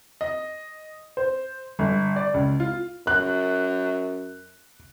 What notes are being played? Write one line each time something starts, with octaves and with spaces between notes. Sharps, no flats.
D#5
C5
G1
D5
C#2
F4
F#2 F#6